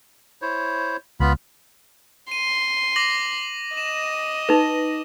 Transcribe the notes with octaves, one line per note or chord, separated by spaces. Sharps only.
E4 C5 C#5
C#2 B3 F4 B5
C6 D#7
D6 A#6 F#7
D#5 E7
D#4 B4 E7